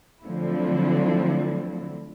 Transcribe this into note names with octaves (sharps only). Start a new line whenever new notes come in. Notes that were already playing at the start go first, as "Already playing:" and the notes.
D3 F3 F#3 A3 C4 E4